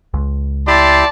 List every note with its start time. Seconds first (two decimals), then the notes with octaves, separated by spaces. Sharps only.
0.14 C#2
0.67 E4 G4 D5 A5 C6